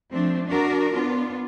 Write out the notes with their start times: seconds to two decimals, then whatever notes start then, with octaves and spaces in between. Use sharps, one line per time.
0.12 F3 A3 C4 D4
0.48 D4 F#4 A#4
0.94 B3 D4 F4